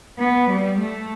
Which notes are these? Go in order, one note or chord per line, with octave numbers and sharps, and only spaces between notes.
B3
G3
A3